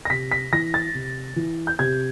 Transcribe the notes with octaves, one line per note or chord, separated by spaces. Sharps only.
A#6
C3 B6
B6
E3 A#6
A6
C3
E3
G6
C3 G#6